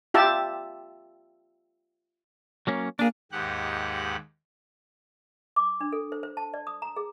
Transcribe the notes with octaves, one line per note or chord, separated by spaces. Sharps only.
F4 G4 E5 A5
F#3 A#3 C#4
A#3 D4 G#4
D#2 G#2 G4 F#5 F#6
D6
D4
A4
C5
C5
A5
D5
D#6
A#5
G#4